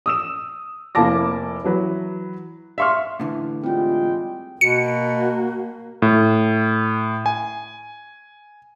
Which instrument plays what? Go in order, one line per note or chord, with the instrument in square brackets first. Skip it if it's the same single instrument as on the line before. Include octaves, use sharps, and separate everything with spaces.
[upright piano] D#6 E6 E7
F1 A#3 E4 A5 D6 A#6
E3 F#3 B4
E5 F5 C6 C#6 F6
[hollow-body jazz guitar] A2 D3 E3
[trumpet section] G3 G#3 G5 [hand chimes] C4 F4
[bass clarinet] B2 [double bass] A#3 [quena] F#4 [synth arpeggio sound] C#7
[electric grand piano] A2
G#5